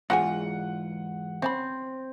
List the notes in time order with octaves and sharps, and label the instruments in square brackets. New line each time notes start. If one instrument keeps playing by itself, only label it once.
[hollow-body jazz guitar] E2 G#2 F4 [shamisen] F#4 C5 G#5 [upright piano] F#5
[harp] C4 [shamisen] C#4 F5 B5